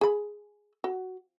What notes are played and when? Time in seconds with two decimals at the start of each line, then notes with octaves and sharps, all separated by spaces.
0.01 G#4 B5
0.84 F#4